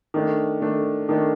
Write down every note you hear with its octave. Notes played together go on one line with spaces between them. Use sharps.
D#3 A3 D4
D#3 A3 D4
D#3 A3 D4